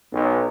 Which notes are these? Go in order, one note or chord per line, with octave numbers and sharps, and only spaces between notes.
B1